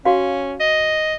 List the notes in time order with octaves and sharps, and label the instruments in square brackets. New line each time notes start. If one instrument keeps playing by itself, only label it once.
[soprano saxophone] C#4 [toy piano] F#4 F5
[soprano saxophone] D#5